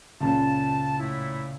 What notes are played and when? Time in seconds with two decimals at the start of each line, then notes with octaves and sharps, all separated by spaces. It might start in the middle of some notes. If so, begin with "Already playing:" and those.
0.21 C#2 A#2 C#3 A5
0.99 A2 A3 E4